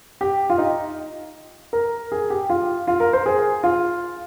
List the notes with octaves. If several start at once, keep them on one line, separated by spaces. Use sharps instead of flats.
G4
F4
D#4
A#4
G#4
G4
F4
F4
A#4
C5
G#4
F4